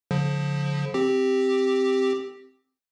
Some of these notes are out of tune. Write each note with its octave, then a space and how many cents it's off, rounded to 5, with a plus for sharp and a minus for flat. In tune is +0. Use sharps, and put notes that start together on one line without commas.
D3 -45 F3 +25
C4 +0 G4 +0